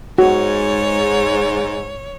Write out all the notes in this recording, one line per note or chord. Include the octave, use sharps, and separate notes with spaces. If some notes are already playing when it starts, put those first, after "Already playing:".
G#2 F#4 C#5